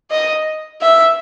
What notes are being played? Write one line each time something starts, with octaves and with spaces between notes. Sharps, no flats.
D#5
E5